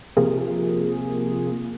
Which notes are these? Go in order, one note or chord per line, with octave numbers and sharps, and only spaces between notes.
C3 F3 A#3 F4 G#4